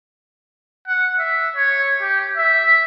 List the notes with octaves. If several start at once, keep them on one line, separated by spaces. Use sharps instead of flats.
F#5
E5
C#5
G4
E5